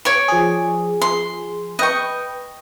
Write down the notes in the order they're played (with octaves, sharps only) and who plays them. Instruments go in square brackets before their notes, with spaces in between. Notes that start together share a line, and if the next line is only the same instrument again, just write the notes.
[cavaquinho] C#5 D5 C#6
[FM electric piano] F3 G#4
[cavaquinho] C6
[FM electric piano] B4 G5 [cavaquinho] D#5 C#6